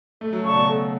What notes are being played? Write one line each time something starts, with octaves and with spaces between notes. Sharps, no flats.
A3 A4
F#3
C#3 D5 A5 C#6
B2
A4